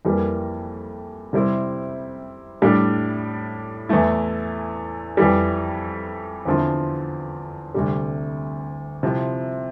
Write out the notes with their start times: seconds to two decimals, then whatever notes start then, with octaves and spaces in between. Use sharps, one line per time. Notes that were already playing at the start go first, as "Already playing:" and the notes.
0.05 F2 E3 G3 A#3
1.33 C3 G3 C4 E4
2.62 A2 G3 D4
3.89 E2 E3 A3 E4
5.17 F2 E3 G3
6.45 E2 D3 F3 C4 E4
7.75 D2 C3 G3
9.03 C3 F3 C4 E4